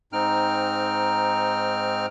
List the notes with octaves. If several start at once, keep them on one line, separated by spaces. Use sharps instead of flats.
G#2 C4 D#4 G5 F6